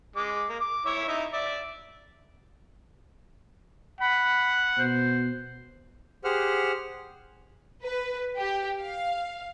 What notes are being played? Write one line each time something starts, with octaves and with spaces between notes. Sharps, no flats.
G#3 D6
A#3
D6
E4 C#5 E5
D#4 E4 E5
D5 E5
F#5 B5
B2 C5
G4 G#4 C5 F#5 F6
B4
G4
F5